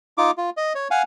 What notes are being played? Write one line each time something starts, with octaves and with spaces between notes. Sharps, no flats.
D#4 F4 D6
F4
D#5
C#5
F5 F#5 G#5